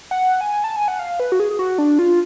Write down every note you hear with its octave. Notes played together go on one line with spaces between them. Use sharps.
F#5
G#5
A5
G#5
F#5
F5
B4
F#4
G#4
G#4
F#4
D4
F4